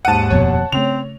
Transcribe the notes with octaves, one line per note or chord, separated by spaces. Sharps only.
D#2 G#2 F#5 A5 D#7
D#1 F2 B2 C#5
C#3 A3 C4 F7